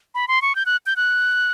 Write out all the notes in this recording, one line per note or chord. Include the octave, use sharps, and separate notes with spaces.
B5
C6
C#6
G6
F#6
G6
F#6